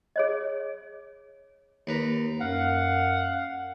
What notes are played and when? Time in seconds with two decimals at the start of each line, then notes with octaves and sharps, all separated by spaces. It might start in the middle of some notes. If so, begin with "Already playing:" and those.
0.16 G#4 C#5 D#5
1.87 D#2 B4 A#5
2.40 F#2 F5 F#5